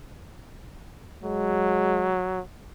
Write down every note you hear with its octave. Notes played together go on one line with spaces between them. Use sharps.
F#3 G#3